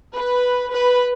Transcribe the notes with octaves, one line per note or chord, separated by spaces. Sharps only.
B4
B4